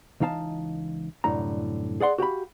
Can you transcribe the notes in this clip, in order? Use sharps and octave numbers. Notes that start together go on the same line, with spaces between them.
C#2 E3 D#4 F5 A5
C2 F#2 A2 D3 A#5
G#4 D5 F#5 C6
F#4 G4 F5 B5